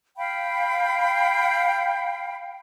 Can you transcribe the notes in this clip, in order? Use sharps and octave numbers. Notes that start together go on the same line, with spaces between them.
F5 G5 B5